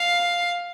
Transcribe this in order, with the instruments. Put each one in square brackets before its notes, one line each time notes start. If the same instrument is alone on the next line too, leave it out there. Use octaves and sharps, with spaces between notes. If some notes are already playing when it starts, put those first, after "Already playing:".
Already playing: [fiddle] F5